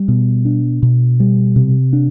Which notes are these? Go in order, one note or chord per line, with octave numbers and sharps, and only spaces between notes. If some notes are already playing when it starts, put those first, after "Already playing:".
Already playing: G3
B2
D4
B2
G3
C3
D4